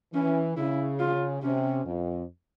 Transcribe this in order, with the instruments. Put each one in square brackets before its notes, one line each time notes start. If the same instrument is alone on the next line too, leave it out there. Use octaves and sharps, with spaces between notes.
[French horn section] E3 [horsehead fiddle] C#4
[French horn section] C#3 [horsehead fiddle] E4
[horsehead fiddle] F4
[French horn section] C3 [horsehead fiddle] C#4
[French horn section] F2